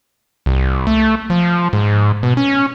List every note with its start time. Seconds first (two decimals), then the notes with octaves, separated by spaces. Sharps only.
0.46 C2
0.87 A3
1.30 F3
1.73 G#2
2.23 B2
2.37 C#4